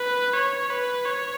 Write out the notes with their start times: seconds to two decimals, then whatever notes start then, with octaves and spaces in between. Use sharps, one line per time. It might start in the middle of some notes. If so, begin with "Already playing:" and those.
Already playing: B4
0.34 C#5
0.70 B4
1.06 C#5